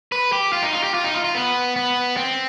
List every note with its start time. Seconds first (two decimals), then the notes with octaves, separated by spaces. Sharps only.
0.12 B4
0.32 G4
0.53 F4
0.63 D#4
0.73 F4
0.84 G4
0.94 F4
1.04 D#4
1.14 F4
1.24 F4
1.35 B3
1.76 B3
2.17 C4